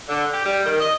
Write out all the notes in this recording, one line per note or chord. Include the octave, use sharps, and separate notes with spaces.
D3
G4
G3
D#3
D#5